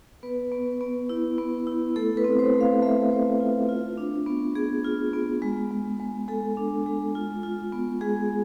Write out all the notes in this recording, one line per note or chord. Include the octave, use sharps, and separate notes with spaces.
B3 B4
B3
B3
E4
B3
E4
A3 A4
B4
C4
C5
A3
F5
A3 E5
A3
F4
F4
D4
B3
B3 G#4
F4
B3
G#3
G#3
G#3
G#3 A4
D4
G#3
F4
F4
B3
G#3 G#4